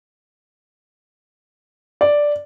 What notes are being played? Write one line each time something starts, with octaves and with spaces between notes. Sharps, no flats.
D5